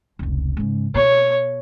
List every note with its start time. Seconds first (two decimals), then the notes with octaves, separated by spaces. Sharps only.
0.19 F1 C#2
0.57 G#2 C#3
0.95 B2 C#5